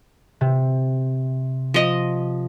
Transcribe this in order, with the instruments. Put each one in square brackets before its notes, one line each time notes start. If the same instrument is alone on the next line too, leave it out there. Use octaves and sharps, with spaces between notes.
[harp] C3
[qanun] F3 D#5